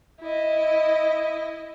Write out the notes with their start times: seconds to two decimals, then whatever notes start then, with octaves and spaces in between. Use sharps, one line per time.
0.21 E4 D#5